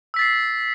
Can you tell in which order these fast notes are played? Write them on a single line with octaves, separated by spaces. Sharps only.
E6 B6 A6 C7